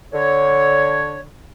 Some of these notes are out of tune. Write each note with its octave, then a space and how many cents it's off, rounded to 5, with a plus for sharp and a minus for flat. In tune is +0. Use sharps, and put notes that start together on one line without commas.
D3 +0 C#5 +0